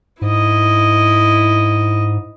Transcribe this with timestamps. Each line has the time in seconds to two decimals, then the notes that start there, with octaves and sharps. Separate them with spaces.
0.22 G#2 E4 D#5